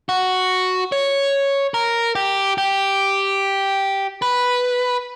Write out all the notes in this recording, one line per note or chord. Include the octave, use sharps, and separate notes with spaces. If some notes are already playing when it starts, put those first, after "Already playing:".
F#4
C#5
A#4
G4
G4
B4